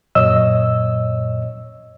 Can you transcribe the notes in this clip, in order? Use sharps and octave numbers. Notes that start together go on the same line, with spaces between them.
F#2 A#2 C#5 D#5 E6